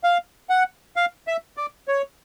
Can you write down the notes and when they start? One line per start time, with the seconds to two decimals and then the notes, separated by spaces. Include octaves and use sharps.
0.04 F5
0.50 F#5
0.96 F5
1.27 E5
1.57 D5
1.88 C#5